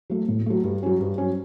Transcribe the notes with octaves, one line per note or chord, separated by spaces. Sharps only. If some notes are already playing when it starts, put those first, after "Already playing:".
F#3 A3
A2
F#3 A3
G2
F#3 C#4
G2
F#3 C#4